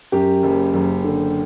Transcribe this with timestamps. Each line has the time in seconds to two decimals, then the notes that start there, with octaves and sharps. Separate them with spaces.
0.12 F#2 G4
0.43 F#1
0.74 F#1
1.04 D3